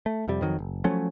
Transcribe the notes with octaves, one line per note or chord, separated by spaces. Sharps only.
A3
F2 C3 G3
F2 D#3 F#3
F#1
F3 F#3 A3 C#4